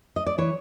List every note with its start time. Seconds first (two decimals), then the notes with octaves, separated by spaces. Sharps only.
0.16 D#5
0.27 D5
0.38 E3 C#5